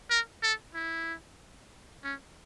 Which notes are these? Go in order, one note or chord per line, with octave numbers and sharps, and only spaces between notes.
A#4
A4
E4
C#4